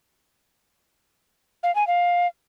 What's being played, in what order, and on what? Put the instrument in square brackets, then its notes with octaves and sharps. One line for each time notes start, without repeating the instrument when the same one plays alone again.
[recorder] F5
G#5
F5